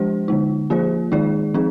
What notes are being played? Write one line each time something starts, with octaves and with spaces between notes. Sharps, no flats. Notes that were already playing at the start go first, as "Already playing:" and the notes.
Already playing: F3 G#3 D4 G4 C5
D3 G#3 D#4
F3 A#3 F4 G#4 C5
D#3 G#3 D#4 G#4 D5
F3 C4 D#4 G#4